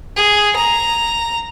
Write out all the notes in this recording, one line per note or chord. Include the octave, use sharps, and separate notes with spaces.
G#4
A#5